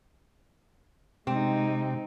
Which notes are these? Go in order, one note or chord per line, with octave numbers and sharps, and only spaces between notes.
C3 G#3 C4 D#4 G4